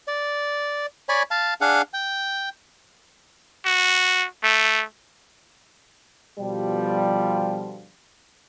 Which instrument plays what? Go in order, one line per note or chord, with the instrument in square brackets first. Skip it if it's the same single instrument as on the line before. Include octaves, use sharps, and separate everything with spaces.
[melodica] D5
C#5 D5 G#5 B5
F5 A5
D4 G#4 F5 F#5
G5
[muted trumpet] F#4
A3
[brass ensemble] B2 D3 F3 G3